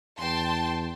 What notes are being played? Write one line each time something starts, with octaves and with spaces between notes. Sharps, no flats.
E2 G5 A5 C6